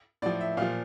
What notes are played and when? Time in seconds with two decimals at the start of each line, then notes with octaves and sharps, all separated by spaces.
0.22 A2 F3 D5
0.41 E5
0.57 A#2 F3 F5